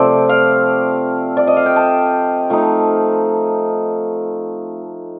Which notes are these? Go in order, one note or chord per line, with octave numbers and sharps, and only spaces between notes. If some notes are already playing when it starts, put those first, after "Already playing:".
Already playing: C3 F3 A3 C4 D5
F5
D5
D#5
F5
G5
A5
F3 A3 D#4